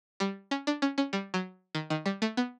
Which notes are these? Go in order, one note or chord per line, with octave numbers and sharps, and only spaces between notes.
G3
C#4
D4
C#4
C#4
G3
F#3
D#3
D#3
G3
A3
B3